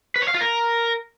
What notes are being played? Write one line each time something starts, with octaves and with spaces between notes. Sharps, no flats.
B4
C#5
F5
F4
A#4